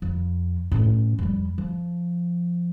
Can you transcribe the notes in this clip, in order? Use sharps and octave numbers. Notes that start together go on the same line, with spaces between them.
F2
A2 C#4
F2 G3
F3